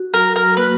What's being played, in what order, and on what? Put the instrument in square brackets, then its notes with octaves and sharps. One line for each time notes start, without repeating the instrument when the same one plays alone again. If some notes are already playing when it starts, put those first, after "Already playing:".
Already playing: [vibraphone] F#4
[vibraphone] F#3 [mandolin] A#4
[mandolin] A#4
[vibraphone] A#3 [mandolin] B4